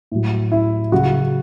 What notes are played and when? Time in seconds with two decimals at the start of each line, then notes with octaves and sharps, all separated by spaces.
0.12 A2 F#3
0.52 E4
0.92 C#3 F#3 F#4